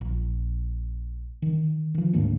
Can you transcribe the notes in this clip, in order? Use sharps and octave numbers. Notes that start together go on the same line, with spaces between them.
A#1
D#3
D#3 F3
D2 G#2 A#3 D4